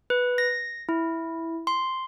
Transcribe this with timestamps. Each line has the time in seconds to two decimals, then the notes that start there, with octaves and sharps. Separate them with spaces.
0.10 B4
0.38 A#6
0.89 E4
1.67 C6